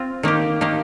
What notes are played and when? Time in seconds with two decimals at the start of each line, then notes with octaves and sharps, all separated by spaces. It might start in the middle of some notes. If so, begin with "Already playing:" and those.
Already playing: C4 F4
0.23 D#3 A#3 G4
0.61 D#3 A#3 G4